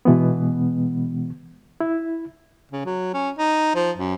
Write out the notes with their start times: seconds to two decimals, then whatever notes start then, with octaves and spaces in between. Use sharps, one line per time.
0.05 B2 E3 G#3 B3
1.80 E4
2.72 C#3
2.85 F#3
3.14 C#4
3.38 D#4
3.75 F3
3.97 F#2